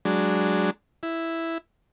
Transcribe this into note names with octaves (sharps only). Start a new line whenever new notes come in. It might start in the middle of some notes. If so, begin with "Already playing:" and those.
F#3 G#3 D4
E4